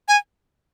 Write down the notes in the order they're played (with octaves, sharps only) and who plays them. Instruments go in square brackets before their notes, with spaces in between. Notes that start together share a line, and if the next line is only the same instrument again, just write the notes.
[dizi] G#5